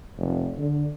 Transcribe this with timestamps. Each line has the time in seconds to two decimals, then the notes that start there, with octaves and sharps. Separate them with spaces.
0.18 F1
0.58 D3